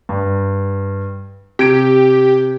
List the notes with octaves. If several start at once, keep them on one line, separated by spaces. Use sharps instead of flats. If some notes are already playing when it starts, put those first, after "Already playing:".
G2
C3 G4 G#6 D7